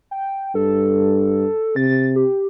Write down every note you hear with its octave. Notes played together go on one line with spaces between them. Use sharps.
G5
G2 A4
C3 A6
G4